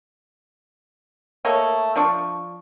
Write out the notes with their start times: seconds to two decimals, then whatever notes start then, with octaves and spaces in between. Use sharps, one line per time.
1.45 A3 A#3 C#5 D#5
1.96 F3 D4 C#6